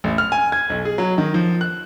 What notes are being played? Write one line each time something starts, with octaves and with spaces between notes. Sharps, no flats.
A1
F6
G#5
G#6
B1
G#4
F#3
D#3
F3
F#6